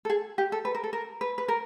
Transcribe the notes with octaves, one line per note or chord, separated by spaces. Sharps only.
A4
G#4
G4
A4
B4
A#4
A4
A#4
B4
B4
A#4